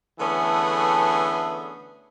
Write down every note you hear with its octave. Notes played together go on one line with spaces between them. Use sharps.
D3 E3 A3 B3 C#4 G#4